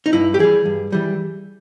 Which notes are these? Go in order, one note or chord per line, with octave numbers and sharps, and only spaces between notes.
D#4
G2 E4
G4
E3 G3 G#4
G2
E3 G3